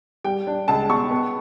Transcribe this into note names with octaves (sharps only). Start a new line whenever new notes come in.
G3 G5
D4
C#2 A5
B2 C#6
B3